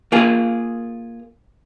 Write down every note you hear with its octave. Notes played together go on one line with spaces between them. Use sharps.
A#3 F4 G#4